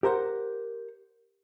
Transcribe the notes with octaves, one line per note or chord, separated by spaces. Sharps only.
G4 A#4 C5 F#5